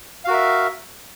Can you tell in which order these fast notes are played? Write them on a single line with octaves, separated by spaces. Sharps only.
F5 F#4 A#4 E5